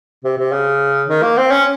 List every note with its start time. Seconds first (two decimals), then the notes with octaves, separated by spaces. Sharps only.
0.24 C3
0.38 C3
0.52 C#3
1.08 D#3
1.23 A#3
1.37 C4
1.52 C#4